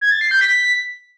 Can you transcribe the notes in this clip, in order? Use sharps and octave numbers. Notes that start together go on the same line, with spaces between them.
G#6
A6
C7
G6
B6